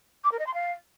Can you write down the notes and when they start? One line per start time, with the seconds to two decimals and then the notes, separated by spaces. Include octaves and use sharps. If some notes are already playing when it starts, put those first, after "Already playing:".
0.24 D6
0.31 A#4
0.39 D#5
0.46 C6
0.54 F5